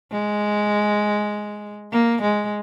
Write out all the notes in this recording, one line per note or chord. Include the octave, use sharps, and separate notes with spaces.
G#3
A#3
G#3